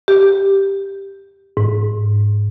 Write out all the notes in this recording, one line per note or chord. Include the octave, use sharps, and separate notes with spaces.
G4
G#2